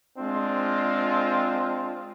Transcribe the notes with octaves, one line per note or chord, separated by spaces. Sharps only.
G#3 C4 D4 F4